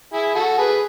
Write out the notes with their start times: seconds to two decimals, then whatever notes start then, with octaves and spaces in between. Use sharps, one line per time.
0.13 E4 G#4
0.35 F#4 A4
0.57 G#4 B4